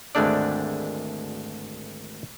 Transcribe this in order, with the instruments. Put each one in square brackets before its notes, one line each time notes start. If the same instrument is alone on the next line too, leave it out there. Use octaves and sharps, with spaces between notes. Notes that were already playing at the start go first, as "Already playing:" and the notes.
[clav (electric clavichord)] G#1 D2 G#3 A3 D4 D5